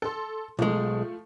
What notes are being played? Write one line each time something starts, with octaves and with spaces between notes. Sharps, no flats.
A4 C6
B1 F3 G#3 A3